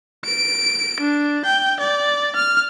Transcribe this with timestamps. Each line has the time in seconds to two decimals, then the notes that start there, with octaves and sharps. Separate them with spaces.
0.25 D7
1.00 D4
1.45 G5
1.80 D5
2.36 F6